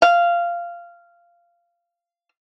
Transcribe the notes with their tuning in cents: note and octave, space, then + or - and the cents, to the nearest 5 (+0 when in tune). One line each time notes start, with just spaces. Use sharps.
F5 -15